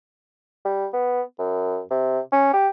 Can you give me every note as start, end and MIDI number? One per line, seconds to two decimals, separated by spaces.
0.65 0.87 55
0.93 1.21 59
1.39 1.81 42
1.91 2.20 48
2.32 2.51 61
2.53 2.69 67